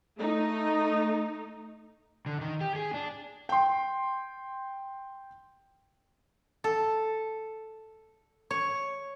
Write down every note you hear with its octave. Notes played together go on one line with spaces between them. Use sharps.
A3 D#4
D3
D#3
G4
G#4
D4
G5 C6
A4
C#5